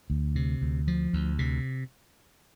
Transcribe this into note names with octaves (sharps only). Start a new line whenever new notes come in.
D2
C3
D2
F3
D2
C3